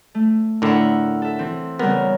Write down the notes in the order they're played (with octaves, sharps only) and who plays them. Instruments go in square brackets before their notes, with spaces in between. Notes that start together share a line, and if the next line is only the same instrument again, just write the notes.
[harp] A3
[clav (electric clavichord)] A2 D3 [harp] A#4 E5 F#5
[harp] A4 E5
E3 C4
[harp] C#3 G3 A#4 [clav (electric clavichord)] B3